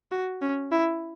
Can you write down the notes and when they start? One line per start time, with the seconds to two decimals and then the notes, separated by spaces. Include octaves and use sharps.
0.12 F#4
0.42 C#4
0.72 E4